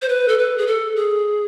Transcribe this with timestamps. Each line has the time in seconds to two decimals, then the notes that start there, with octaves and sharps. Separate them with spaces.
0.02 C5
0.09 B4
0.28 A4
0.38 B4
0.58 G#4
0.67 A4
0.96 G#4